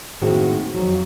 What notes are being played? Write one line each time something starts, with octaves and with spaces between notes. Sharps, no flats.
A2 D#3 G#3 A#3 C4 F#4
F2 F#3